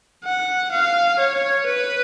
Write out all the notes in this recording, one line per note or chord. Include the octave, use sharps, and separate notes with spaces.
F#5
F5
C#5
B4